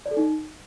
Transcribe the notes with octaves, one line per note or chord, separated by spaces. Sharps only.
D5
A4
D#4